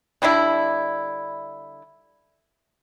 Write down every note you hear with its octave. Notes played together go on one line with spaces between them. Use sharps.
D3 G3 D4 E4